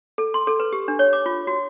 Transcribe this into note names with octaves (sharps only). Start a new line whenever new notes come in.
A4
C6
A4
B4
G4
D4
C#5
D6
F4
F#4